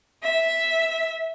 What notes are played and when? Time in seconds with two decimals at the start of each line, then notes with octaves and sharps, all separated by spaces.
0.21 E5